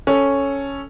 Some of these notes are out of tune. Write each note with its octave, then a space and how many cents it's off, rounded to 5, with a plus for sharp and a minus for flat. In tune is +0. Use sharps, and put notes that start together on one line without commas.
C#4 +0 A4 +0